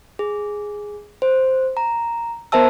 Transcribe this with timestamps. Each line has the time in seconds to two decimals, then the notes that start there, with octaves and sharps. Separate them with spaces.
0.19 G#4
1.22 C5
1.77 A#5
2.52 B3 A#4 C5 E5 A5 E6